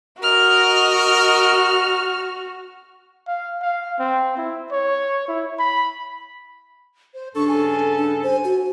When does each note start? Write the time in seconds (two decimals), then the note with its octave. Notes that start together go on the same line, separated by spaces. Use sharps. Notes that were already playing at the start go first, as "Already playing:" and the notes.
0.22 F#4 A#4 D#5 F6
3.27 F5
3.62 F5
3.99 C4
4.37 E4
4.71 C#5
5.28 E4
5.59 B5
7.14 C5
7.35 G2 C#3 D4 A4 C#6
7.48 G#5
7.98 D4
8.23 C5 G#5
8.44 F#4